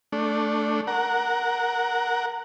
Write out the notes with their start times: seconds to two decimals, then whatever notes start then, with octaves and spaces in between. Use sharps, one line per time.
0.12 A3 D4
0.87 A#4 F#5